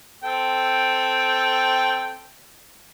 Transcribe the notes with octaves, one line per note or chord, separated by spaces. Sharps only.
C4 A4 G5